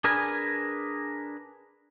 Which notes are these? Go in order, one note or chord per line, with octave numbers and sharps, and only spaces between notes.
D4 G#4 A#4 B4 G#5